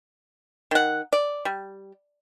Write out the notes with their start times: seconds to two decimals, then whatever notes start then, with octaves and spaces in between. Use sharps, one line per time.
0.71 D#3 F#5
1.13 D5
1.45 G3